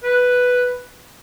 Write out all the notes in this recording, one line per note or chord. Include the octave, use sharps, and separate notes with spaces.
B4